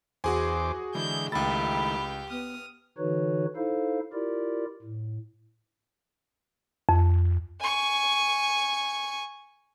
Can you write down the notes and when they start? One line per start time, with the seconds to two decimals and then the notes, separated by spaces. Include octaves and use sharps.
0.24 E2 F#4 G#4 C5 G#5 D6
0.95 D3 E3 G#3 G6
1.32 C#2 D#3 A3 E4 G4 G5 B5 A6
2.30 B3 D#6 F6
2.98 D3 E3 D#4 F#4 B4 C#5
3.56 D#4 E4 A4 C5 F5
4.13 E4 F4 G4 A#4 D5
4.82 A2
6.89 F2
7.60 G#5 C#6